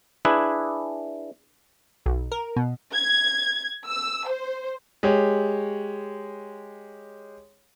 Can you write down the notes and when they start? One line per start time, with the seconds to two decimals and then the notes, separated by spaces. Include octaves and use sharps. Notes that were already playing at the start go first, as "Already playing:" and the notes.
0.25 D4 E4 G#4 B4
2.06 B1
2.32 A#4
2.56 B2
2.94 G#6
3.87 E6
4.29 C5
5.03 G#3 G4 C#5